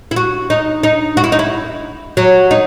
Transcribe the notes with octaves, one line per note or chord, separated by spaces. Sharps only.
E4
F#4
D#4
D#4
F#4
E4
D#4
E4
F#3
D#4